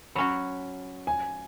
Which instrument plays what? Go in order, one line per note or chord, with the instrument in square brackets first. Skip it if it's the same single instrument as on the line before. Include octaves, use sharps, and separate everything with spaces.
[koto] F#3 C#4 F#4 [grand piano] B5
[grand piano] G#5